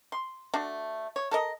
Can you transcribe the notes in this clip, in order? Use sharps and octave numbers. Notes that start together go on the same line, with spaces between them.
C6
A3 D4 F#4
C#5
A4 A#4 D#5